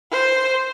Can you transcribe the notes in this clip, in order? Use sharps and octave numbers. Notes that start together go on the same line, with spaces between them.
C5